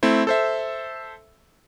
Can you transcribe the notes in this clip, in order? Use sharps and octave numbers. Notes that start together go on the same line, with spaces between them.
A3 C4 E4
A4 C5 E5